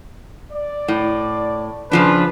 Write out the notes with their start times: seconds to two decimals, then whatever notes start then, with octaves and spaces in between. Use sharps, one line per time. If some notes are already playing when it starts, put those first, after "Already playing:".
0.52 D5
0.88 A2
1.91 C#3 F3 D4 B4